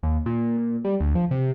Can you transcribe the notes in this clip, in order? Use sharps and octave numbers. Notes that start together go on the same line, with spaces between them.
D#2
A#2
A#2
G3
D2
F3
C3